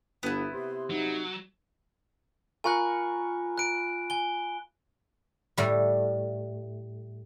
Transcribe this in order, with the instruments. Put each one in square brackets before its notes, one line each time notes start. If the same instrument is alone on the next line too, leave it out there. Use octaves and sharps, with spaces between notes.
[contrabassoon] G1 [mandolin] B3 E4
[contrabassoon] C3 [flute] C6
[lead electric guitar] F#3 [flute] D#4
[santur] F4 A#4 C#6 [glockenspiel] G#5 B5 F#6
[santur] B5 [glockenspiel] F#6 D7
[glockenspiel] G#5 G7
[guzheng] A2 G3